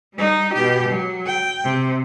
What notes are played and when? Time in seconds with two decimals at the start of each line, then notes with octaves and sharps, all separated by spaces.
0.15 G3 D#4
0.54 B2 G4
0.88 F#3
1.26 G5
1.64 C3